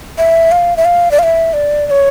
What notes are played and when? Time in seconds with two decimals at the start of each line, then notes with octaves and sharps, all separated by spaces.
0.18 E5
0.52 F5
0.77 E5
0.85 F5
1.11 D5
1.19 F5
1.23 E5
1.53 D5
1.87 D5
1.91 C#5